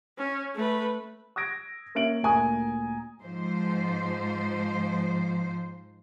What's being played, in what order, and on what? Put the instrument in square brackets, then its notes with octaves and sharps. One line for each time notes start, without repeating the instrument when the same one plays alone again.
[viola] C#4
A3 B4
[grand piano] D#6 E6 G#6 A#6 D7
A#3 C#4 E5 D7 F#7
D2 A#2 A#4 G#5 A#5 D#6
[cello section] G#2 F3 C5